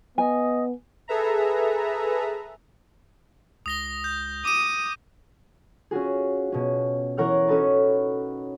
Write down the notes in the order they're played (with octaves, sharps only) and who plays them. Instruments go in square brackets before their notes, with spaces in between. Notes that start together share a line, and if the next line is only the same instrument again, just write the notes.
[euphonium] B3 [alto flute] D#5 [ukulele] G#5
[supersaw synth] G#4 A4 B4 E5 A#5
[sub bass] C#2 [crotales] D#6 A#6 G7
[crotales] G6
[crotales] D6 D#7 [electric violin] D#6
[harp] C#4 F4 F#4 G#4
B2 C#4
E3 A#4 C#5 F#5 F6
C#4 D#4 F#4 A4 B4